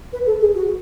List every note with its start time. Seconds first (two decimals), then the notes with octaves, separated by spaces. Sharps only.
0.13 B4
0.26 A4
0.41 G#4
0.55 F#4